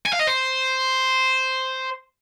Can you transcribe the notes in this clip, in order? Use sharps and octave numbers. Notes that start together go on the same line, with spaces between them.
G#5
F5
D#5
C5